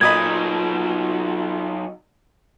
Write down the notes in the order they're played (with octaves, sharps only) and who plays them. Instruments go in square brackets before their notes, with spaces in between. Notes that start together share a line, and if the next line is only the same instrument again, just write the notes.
[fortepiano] A#2 D#5 B5 [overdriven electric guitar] F#3 D#4 [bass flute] F4 [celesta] G#6